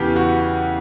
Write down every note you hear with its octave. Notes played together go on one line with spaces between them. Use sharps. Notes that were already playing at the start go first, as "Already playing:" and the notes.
Already playing: E2 C#3 E3 B3 G4 A4
F#4